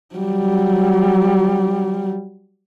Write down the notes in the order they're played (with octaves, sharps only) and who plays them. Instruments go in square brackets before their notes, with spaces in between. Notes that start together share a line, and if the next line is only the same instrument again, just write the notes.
[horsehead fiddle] F#3 G3